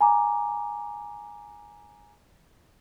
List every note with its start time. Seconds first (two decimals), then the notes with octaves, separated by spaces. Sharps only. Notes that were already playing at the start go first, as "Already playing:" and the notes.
0.01 G#5 A#5 D6